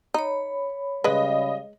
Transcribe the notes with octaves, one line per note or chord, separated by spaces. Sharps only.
D#4 C#5 B5
C#3 G3 G#3 B4 D#5 F5